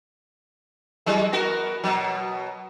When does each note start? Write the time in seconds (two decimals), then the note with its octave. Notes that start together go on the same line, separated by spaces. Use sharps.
1.06 E3 F#3 G#3
1.33 B3 F#4 A#4
1.84 B2 F#3